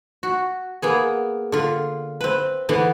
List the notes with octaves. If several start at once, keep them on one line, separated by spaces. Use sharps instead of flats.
F#4
A#3 B3 G#4
D3 F4
C4 B4
D3 E3 B3